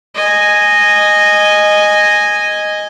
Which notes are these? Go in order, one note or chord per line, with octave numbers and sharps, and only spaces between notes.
D#5 G#5